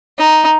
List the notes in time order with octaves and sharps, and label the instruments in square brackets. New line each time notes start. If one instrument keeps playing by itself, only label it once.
[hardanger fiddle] D#4